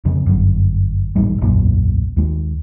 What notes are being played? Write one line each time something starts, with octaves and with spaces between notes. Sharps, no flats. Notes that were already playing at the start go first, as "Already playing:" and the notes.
F2 C#3
G1 F#2
D#1 A1 G#2 G3
E1 B1 F#2 A#2
D#2 G#3